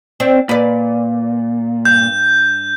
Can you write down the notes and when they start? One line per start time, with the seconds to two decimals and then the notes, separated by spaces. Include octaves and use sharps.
0.20 C4 D4
0.49 A#2 B4 D5
1.85 G2 G6